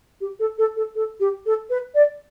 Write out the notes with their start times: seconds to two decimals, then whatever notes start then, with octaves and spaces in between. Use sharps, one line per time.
0.20 G4
0.39 A4
0.58 A4
0.76 A4
0.95 A4
1.19 G4
1.45 A4
1.69 B4
1.94 D5